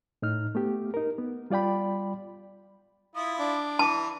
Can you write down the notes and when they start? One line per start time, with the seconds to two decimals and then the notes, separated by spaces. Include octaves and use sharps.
0.22 A2 D#4 F6
0.55 A3 B3 G4
0.94 D#4 A#4
1.18 B3
1.50 G3 F4 D5 G5 B5
3.15 E4 F4 D#6
3.39 D4 D6
3.79 E3 A5